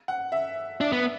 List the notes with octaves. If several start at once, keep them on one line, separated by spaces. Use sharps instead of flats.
F#5
E5
D4 E5
B3